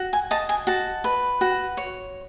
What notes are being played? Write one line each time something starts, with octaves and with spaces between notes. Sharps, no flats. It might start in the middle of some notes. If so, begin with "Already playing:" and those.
Already playing: F#4
G#5
D#5 A5
G#5
F#4 A5
B4
F#4
C#5